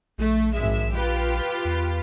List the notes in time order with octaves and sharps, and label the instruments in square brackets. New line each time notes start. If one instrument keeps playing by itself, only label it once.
[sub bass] A#1 [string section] A3
[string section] G#1 G#3 E5
F4 G4 B4
[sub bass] E2